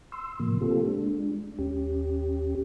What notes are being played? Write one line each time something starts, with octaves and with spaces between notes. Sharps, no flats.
C6 E6
A2 C3 F3 A#3
A#3 C4 F4 G4 A4
G#3 D4
D#2 C#4 G4